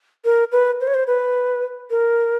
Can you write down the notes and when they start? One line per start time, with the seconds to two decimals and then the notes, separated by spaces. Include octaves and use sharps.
0.25 A#4
0.52 B4
0.81 C5
0.87 C#5
0.94 C5
1.07 B4
1.90 A#4